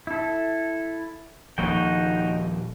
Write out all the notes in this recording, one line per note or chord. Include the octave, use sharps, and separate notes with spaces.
E4 A4
D#1 F3 A#3 D#4 F#4 G5